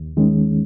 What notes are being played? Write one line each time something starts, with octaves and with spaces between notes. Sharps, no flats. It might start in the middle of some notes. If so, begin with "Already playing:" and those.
Already playing: D#2
D#3 G#3 C#4